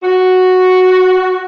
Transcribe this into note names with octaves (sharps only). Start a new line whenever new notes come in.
F#4